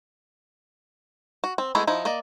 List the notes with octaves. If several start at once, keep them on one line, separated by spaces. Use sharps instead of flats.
F#4
C4
G#3 A3 B3 E4 G#4
F3 D#4 E4
A#3 D5 D#5